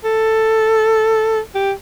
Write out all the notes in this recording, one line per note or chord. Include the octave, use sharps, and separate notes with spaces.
A4
G4